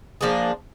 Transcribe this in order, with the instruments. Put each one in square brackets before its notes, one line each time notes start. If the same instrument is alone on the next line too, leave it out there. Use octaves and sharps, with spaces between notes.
[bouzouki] F3 A#3 D4 G#4